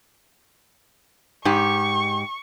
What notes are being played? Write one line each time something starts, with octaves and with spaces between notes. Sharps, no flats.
G#2 G4 C#6